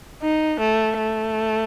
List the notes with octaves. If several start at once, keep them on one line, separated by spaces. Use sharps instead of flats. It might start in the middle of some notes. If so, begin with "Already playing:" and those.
D#4
A3
A3